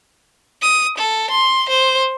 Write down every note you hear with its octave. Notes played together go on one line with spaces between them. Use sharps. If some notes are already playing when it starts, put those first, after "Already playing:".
D#6
A4
C6
C5